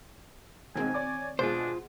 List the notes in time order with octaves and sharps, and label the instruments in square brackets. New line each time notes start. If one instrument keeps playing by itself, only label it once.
[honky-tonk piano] B1 G#3 D#4 [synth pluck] D#3 C4 [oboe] G#5
[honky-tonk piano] C#5 D5 D6
[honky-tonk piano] B2 G#3 G#4 [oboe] D4 [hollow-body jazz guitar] F4 C5